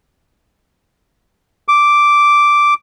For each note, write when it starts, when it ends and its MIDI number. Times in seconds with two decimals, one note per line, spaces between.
1.68 2.74 86